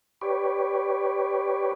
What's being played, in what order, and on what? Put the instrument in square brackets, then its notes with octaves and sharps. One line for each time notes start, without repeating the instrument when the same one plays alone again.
[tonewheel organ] G4 B4 C#5 D5